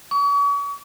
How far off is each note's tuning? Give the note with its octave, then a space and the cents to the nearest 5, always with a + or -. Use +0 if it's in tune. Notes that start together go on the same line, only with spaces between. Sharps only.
C#6 +40